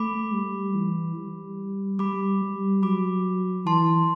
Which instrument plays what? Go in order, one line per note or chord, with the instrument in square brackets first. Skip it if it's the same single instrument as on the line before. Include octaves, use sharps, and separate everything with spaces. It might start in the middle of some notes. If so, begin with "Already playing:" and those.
Already playing: [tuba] A3 [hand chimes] B5 D6
[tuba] G3
E3
G3
[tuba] G3 [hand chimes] B5 D6
[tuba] G3
[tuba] F#3 [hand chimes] B5 D6
[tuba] E3 [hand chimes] A5 C6